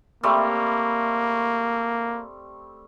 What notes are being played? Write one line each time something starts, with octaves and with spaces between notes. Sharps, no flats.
G3 A3 A#3 C4